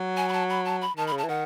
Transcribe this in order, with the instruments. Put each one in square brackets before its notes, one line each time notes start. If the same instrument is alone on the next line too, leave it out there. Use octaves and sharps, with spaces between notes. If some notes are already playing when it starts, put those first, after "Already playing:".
Already playing: [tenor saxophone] F#3
[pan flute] G#5
B5
A5
B5
A5
B5
[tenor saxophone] D#3 [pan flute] A5
[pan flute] B5
[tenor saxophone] C#3
[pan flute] A5
[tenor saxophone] E3
[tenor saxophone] D#3 [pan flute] F#5